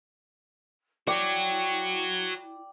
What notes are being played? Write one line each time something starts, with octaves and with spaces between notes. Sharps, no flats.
E4 F#4 C#5 D5 G5